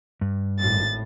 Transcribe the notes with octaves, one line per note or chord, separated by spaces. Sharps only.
G2
G#1 A2 A6